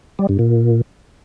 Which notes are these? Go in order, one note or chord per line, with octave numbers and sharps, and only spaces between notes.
G3
G2
A#2